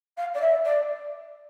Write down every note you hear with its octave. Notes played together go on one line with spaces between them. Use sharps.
F5
D5
E5
D5